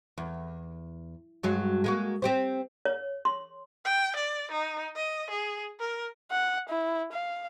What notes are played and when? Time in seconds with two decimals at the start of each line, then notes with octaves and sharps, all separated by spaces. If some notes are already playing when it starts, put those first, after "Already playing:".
0.18 E2
1.43 G2 F#3 G#3
1.84 G#3 A#3 F#4
2.22 C4 G4 C5
2.85 C#5
3.25 C6
3.85 G5
4.16 D5
4.52 D#4
4.96 D#5
5.30 G#4
5.80 A#4
6.31 F#5
6.69 E4
7.13 F5